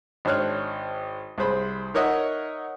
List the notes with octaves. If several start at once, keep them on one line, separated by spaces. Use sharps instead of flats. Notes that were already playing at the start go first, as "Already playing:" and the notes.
G#1 D4 C5 C#5 F6 F#6
C2 G#4 C5 B5
D#4 A#4 C#5 D#5 E5 F#5